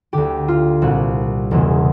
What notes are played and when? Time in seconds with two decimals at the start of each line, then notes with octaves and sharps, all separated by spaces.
0.13 D2 D3 G4
0.48 F4
0.82 C2 A#2 F#4
1.51 E1 E2 C#3